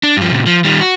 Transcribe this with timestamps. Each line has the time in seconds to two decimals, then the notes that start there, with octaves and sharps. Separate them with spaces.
0.03 D4
0.17 G2 F3
0.32 A#2 C#3
0.46 F3
0.65 D#3 G3
0.81 F#4